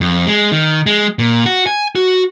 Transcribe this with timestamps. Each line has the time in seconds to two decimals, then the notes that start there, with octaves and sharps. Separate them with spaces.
0.01 F2
0.27 G#3
0.52 D#3
0.86 G#3
1.19 A#2
1.46 F#4
1.67 G#5
1.95 F#4